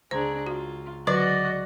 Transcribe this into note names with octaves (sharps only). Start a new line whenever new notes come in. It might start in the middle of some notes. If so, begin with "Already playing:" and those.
C#2 D4 G#4 C5 A#5 G#6
F4 F#4
D3 F#3 F#4 G#4 B4 D5 D#5 F#5